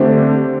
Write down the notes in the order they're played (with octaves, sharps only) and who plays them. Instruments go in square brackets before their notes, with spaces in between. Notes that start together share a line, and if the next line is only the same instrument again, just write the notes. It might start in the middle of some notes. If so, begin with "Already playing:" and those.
Already playing: [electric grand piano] D3 A3 D4 G4 [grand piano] C4